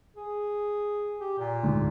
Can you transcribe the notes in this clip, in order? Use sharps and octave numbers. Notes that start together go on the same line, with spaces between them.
G#4
G4
A#2
D2 G#2